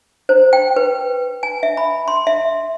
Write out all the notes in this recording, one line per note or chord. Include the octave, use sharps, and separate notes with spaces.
C5
G5
B4
G#5
E5
B5
C6
E5